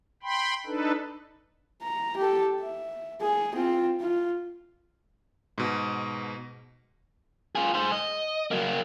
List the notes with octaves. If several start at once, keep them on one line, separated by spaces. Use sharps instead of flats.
G5 B5 C6
D4 D#4 A4 B4
A#5
G4 A4
E5
G#4
C4 F4
F4
G#2 B2
F4 G#4
G#4 C5
D#5
F#3 A#3